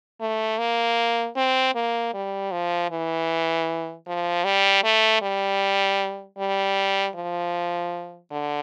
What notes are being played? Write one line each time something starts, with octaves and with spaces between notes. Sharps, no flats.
A3
A#3
C4
A#3
G3
F3
E3
F3
G3
A3
G3
G3
F3
D3